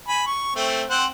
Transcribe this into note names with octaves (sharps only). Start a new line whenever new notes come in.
G#5 B5
C#6
A3 C4
C4 C5 F#5